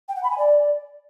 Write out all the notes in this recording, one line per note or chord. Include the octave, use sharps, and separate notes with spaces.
G5
F#5
B5
G#5
D5